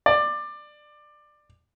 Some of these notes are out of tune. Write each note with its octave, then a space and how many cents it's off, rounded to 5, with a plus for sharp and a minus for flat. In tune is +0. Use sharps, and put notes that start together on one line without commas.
D5 +20